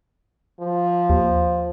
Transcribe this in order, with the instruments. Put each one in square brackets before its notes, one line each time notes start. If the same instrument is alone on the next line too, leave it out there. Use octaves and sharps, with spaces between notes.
[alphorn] F3
[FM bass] D#2